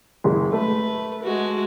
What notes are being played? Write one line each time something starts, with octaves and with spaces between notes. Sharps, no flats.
F#1 G#3
A3 B4
G#3 F#4